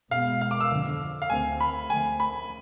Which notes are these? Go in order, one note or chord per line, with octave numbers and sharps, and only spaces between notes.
B2 G#3 B3 F5
F5
D6
E6
F2 D3 F3
F5
D2 D3 A3 C4 G#5
B5
D2 D3 F3 A3 C4 G#5
B5